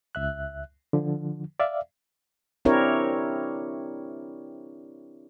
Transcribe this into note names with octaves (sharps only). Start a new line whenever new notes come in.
C#2 E5 F#6
D3 F3
D5 E5 F5
C4 D4 E4 G4 A#4 C#5